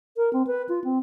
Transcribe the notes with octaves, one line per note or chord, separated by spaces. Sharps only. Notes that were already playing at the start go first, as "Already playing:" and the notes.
A#4
C4
B4
F4
C4